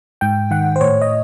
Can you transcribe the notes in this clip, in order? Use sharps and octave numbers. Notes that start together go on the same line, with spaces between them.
G#2 G5
D#3 F#5
C5
A2 C#5
D#5